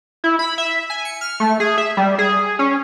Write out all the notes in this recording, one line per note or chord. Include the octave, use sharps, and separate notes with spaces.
E4
B5
E5
G#5
C#7
F6
A3
G#4
E5
G3
G#4
C#4